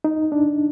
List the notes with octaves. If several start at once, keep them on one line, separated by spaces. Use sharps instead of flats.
D#4
D4